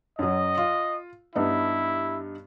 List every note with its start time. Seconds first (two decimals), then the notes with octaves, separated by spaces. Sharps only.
0.19 F#2 F#3 D#5
0.57 F4
1.35 G2 B3 D#4 E4